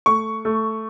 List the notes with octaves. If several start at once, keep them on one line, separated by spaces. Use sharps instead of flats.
A3 C#6
A3